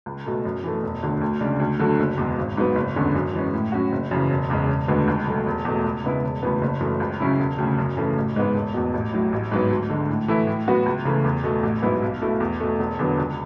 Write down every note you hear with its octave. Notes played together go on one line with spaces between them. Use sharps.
C#2
B2 A3
F#2
E3 A3
E1
D2 D3
D2
C#3 G#3 D4
D2
D3 F#3 A3
F#1
E2 B2 G#3
G#1
G#2 F#3 B3
F#1
E2 D3 G#3 C#4
F#2
E3 G#3 C#4
A2
F#3 C#4 F#4
F#1
F#2 C#3 E3
E1
E2 C#3 G#3 C#4
E1
D2 D3 G#3 B3
C#2
B2 F#3 A3
E1
E2 B2 A3
C#2
C#3 G#3 B3 E4
E1
D2 C#3 E3 B3
F#1
F#2 E3 A3
C#2
C#3 F#3 C#4 E4
E1
D2 C#3
F#2
C#3 E3 A3
A1
G#2 G#3 B3
E1
E2 B2
A1
A2 F#3
A1
G#2 F#3 B3
D2
D3 G#3
A2
E3 A3 E4
A2
F#3 B3 F#4
C#2
C#3 E3 A3
E2
B2 A3
A1
G#2 F#3 B3 E4
B1
B2 A3 E4
E2
B2 A3
E1
E2 D3 F#3 B3
C#2